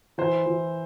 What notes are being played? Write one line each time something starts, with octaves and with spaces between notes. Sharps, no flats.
E3 C5
E3